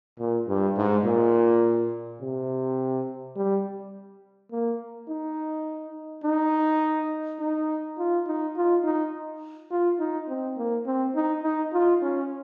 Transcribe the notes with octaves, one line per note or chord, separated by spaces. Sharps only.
A#2
G2
G#2
A#2
C3
G3
A#3
D#4
D#4
D#4
F4
D#4
F4
D#4
F4
D#4
C4
A#3
C4
D#4
D#4
F4
C#4